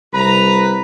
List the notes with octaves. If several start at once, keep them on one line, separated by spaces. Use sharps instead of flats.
C2 B4 A#5